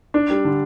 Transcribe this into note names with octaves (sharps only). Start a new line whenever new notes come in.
D4
G3
D3